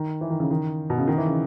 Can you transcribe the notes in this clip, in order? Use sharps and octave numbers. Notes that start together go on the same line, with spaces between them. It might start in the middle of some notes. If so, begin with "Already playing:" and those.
Already playing: D#3
E3
D#3
C#3
D#3
B2
C#3
D#3
E3
C#3